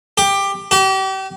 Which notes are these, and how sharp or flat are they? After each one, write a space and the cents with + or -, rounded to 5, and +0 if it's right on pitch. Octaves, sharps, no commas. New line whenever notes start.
G4 +15
G4 -35